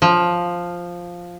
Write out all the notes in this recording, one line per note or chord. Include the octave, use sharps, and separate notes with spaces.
F3